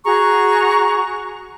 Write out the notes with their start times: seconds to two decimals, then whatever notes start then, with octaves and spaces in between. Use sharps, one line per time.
0.05 F#4 G#4 A#5 C#6